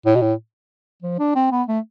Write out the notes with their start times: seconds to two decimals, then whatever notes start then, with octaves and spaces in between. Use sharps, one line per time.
0.06 A2
0.15 B2
0.22 A2
1.03 F3
1.19 D4
1.35 C4
1.51 B3
1.68 A3